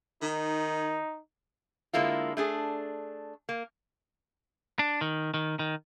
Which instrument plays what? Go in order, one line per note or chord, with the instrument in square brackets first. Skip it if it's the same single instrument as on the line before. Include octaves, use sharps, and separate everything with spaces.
[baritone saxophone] D#3 [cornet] D#4
[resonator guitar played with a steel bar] D3 G#3 A#3 E4 F4
A3 D4 G#4
A#3
[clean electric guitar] D4
D#3
D#3
D#3